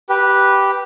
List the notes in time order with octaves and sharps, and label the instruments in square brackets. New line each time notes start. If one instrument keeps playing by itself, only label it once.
[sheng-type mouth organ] G4 B4